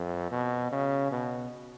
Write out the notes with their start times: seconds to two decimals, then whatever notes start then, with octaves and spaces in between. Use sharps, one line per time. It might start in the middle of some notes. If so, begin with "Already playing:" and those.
Already playing: F2
0.32 B2
0.72 C#3
1.11 B2